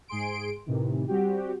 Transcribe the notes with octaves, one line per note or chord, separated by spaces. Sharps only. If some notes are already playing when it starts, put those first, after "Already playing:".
G#2 G#4 C6 D7
A2 C3 D#3 E3
G3 C4 F#4 G4